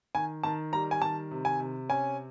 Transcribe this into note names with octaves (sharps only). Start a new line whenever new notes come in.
D#3 G#5
D#3 A5
G3 A#5
G#5
D#3 A5
C3
G#5
C3
C#4 G#5